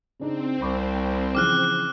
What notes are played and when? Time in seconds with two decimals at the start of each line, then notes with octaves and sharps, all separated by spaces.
0.20 C#3 C4 D4 D#4
0.61 C2 B5 C#6 D6
1.35 C#3 E3 F3 D6 F6 F#6